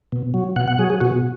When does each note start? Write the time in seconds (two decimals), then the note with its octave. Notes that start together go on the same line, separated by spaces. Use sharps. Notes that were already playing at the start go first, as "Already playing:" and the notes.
0.12 B2
0.34 F#3
0.56 B2 F#5
0.68 F#5
0.79 F#3 G#4
0.90 G#4
1.00 B2 F#4